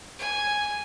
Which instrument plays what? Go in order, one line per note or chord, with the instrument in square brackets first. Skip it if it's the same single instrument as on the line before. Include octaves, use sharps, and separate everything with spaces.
[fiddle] G#5